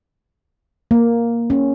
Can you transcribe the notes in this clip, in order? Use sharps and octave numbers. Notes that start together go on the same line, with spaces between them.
A#3
C#4